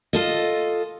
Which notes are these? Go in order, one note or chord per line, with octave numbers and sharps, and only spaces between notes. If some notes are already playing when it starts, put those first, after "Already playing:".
F4 A4 D#5